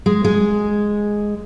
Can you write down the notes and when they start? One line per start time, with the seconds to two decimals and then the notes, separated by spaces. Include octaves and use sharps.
0.06 G#3
0.24 G#3